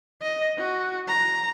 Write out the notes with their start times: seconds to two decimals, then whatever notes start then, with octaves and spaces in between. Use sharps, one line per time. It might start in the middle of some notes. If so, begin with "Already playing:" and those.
0.22 D#5
0.57 F#4
1.08 A#5